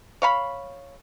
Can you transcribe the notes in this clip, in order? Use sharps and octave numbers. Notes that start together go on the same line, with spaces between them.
C#5 F5 B5